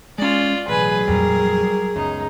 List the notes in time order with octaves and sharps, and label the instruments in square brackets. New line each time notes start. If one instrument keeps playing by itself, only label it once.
[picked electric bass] G#3 C#4 [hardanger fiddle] F4 D5
[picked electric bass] A1 [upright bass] B2 [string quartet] F#3 G#4 [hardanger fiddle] B4 G#5
[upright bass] F2 A#2 [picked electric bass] G3 [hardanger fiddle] A#4
[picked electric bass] C#2 F#2 [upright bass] B3 [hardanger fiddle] D#4